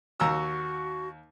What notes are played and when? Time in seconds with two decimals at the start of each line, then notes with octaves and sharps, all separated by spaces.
0.20 D#2 F#4 A#5 E6